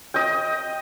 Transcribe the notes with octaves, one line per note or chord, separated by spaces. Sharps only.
D#5 G5